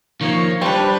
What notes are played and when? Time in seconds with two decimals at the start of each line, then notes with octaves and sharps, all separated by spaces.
0.21 D#3 F3 A#3 C#5
0.61 G3 C4 D4 B4